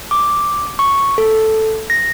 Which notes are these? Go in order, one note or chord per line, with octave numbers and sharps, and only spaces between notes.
D6
C#6
A4
A#6